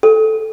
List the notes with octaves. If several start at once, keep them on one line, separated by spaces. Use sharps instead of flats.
A4